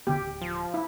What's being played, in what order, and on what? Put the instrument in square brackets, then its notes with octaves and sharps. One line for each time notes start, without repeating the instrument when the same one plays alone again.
[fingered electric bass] E1 D3 B3 [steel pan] G4
[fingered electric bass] D1
[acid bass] F3
[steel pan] E4